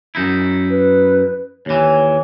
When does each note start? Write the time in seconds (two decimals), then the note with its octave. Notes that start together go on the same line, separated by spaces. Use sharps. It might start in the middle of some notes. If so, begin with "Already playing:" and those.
0.15 F#2 D#4 E4
0.70 B4
1.66 D#2 E3 C#5